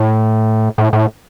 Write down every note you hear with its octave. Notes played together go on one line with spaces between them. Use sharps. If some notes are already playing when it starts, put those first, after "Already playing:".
Already playing: A2
A2
A2